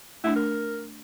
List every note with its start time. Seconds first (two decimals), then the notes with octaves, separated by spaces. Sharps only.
0.24 A3 D4 E4
0.36 A#4